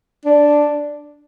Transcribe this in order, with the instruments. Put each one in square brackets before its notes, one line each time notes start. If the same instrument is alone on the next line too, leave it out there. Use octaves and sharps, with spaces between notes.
[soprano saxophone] D4